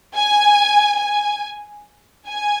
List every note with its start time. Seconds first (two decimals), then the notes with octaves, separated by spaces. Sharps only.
0.16 G#5
1.00 G#5
2.28 G#5